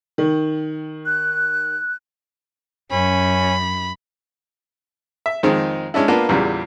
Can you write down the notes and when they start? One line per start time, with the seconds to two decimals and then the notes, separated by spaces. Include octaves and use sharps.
0.18 D#3
1.07 F#6
2.91 F#2 C#4 B5
5.26 E5
5.43 F2 D#3 G#3 C4 D#4
5.94 G#3 C#4 D4 E4
6.08 A#3 B3 D4 F4
6.29 E2 A#2 C#3 G3